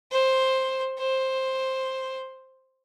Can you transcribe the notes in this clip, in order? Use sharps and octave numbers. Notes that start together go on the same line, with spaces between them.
C5
C5